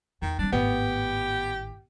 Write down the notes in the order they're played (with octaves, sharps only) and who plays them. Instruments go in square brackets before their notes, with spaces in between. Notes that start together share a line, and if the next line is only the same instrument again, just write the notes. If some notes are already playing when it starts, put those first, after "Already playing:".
[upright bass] E2 [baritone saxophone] D#3
[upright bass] G3 C4 [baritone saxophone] D4
[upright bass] G#1 A2 [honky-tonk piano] B3 [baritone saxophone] G4